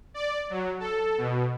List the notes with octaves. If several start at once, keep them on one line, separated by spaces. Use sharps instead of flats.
D5
F#3
A4
B2